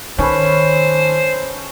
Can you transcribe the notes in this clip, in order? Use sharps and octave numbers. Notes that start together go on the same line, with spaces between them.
D#3 C#4 A4 B4 C5